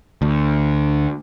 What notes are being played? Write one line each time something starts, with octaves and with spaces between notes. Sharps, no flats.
D2